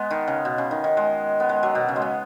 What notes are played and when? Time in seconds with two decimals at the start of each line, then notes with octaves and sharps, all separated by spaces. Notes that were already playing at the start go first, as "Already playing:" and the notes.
Already playing: G#3 B3
0.10 D#3
0.28 C#3
0.45 B2
0.58 C#3
0.71 D#3
0.84 D#3
0.97 G#3
1.40 B3
1.49 G#3
1.63 F#3
1.75 B2
1.88 C#3
1.96 G#3
2.02 B3